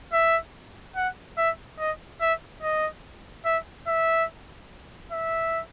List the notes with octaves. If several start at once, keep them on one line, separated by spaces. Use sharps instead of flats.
E5
F#5
E5
D#5
E5
D#5
E5
E5
E5